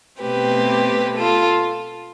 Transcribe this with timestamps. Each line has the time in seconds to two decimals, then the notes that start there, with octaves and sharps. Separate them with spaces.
0.21 B2 A3 C4 G4 B4
1.17 F4 A4